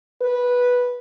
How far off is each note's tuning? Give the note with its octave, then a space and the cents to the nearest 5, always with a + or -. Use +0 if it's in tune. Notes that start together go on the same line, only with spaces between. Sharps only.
B4 -10